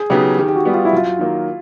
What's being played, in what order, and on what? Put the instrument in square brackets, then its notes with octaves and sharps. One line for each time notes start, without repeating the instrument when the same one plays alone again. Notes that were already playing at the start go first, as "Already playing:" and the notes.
Already playing: [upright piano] G#4
[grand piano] C#3 F#3 B3 D#4 [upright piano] G4
[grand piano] D#3 [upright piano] G4
[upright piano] G4
F#4
[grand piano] G3 B3
[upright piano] F4
E4
[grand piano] F#2 [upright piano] F4
[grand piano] D#3 F#3 A#3